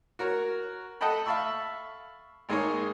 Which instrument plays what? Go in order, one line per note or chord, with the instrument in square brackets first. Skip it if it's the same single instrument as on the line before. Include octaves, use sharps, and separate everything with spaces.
[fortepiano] F#4 A#4 C#5
A4 D#5 F#5 G5 A5 B5
E5 F5 A5 B5 C#6 E6
G#1 G#3 A#3 D#4 G#4 C#5